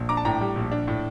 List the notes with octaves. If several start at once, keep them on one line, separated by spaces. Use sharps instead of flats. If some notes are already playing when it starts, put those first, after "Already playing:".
Already playing: A#1
D4 A#5 D6
A5
A2 G5 A#5
G3
A#1
D4
A2